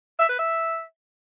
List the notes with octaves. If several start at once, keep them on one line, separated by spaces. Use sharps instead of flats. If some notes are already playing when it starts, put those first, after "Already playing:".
E5
B4
E5